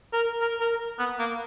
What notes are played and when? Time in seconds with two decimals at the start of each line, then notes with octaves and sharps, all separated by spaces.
0.13 A#4
0.41 A#4
0.61 A#4
0.99 B3
1.19 A#3